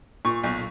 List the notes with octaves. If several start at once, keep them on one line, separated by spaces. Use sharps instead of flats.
A#2 C#6
B1